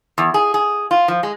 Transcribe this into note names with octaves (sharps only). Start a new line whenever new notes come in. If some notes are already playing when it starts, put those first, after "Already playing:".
E2
G#4
G#4
F4
F3
G#3